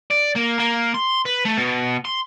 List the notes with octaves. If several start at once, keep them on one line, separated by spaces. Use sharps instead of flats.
D5
A#3
A#3
C6
B4
A3
B2
C6